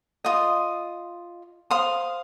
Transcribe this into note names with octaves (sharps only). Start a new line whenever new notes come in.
F4 D#5 C6 D#6
C5 F5 C6 D#6